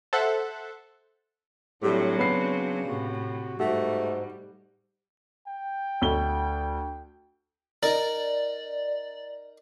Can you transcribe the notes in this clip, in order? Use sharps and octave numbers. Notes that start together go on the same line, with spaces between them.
A4 C5 E5 F#5 F#6
A2 F#3 G3 C4 D4 F#4
C#3 B3 C7
A2 C3 F#4
G#2 G3 A3 F#4
G5
D2 G7
D#4 A#4 D5